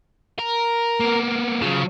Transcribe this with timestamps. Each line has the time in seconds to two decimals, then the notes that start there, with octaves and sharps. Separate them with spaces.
0.39 A#4
1.00 A#3 B3
1.62 C#3 F#3 F4